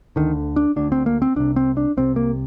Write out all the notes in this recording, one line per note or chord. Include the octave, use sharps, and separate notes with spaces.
D2 D3 D#3
D4
D2 D3 D4
C4
A#3
C4
C2 C3 D4
C4
D4
C2 C3 C4
A#3